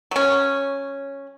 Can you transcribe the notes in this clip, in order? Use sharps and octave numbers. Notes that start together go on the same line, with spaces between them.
F#3 C#4